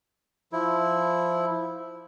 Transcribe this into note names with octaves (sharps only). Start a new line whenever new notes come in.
F3 E4